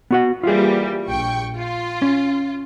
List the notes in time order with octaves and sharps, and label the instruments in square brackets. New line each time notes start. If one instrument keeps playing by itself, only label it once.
[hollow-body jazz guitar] B3 F#4 F#5
[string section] E3 G3 A#3 [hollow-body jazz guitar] F4 G#4
[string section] A#1 G5 C#6
F4
[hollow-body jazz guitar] C#4